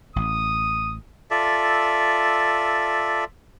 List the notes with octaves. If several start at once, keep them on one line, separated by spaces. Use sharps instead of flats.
A1 D#6
F4 A4 D5 E5